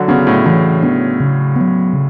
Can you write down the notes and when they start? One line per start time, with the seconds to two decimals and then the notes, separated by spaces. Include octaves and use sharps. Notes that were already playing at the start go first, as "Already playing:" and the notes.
Already playing: D3 F#3
0.08 C#3 B3 D4
0.27 A2
0.45 A2 E3
0.83 B3 D4
1.20 C#3
1.56 F#3 B3
1.93 C#3